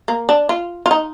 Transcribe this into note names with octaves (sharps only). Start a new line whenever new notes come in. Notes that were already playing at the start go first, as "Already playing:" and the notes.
A#3
D4
F4
F4
D#4